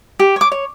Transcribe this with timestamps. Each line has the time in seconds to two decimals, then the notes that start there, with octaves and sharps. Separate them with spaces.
0.19 G4
0.36 C#5 D6
0.52 C#5